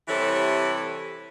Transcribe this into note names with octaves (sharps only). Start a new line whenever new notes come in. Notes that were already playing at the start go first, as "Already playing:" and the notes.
C3 E3 G3 E4 A4 C#5